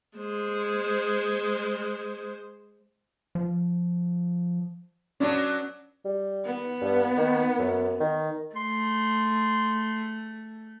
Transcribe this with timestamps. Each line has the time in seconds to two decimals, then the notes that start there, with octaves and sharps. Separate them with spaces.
0.18 G#3 C5
3.35 F3
5.20 F#3 B3 C#4 D4 D5
6.05 G3
6.45 B3
6.81 G2
7.17 D#3
7.59 F#2
8.00 D#3
8.56 A3 C6